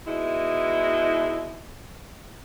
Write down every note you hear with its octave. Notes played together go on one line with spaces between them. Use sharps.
B2 G#3 D#4 E4